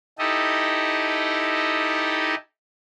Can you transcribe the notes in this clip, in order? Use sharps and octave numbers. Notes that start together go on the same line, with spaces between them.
D#4 E4 G4 A4 D#5